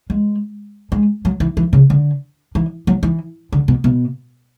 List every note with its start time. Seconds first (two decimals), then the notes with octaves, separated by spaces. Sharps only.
0.10 G#3
0.92 G#3
1.25 F#3
1.40 E3
1.57 E3
1.73 C#3
1.90 D3
2.55 E3
2.87 F#3
3.03 E3
3.52 D3
3.68 B2
3.84 B2